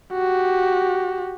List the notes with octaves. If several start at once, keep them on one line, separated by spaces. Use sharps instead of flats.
F#4 G4